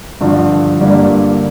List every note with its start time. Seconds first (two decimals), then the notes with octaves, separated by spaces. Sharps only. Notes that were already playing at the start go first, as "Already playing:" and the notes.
0.21 G2 D3 F3
0.81 G2 D3 G3 A#3